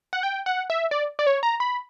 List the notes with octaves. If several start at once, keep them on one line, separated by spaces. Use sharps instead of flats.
F#5
G5
F#5
E5
D5
D5
C#5
A#5
B5